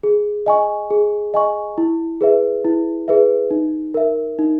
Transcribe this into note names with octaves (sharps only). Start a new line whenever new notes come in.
G#4
D#5 G#5 C#6
G#4
D#5 G#5 C#6
E4
G#4 B4 E5
E4
G#4 B4 E5
D#4
A#4 E5
D#4